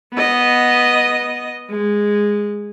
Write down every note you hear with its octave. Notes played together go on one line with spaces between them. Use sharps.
B3 D#5
G#3